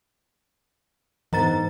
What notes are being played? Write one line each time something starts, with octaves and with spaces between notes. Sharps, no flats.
G#2 E3 B3 A#5 A6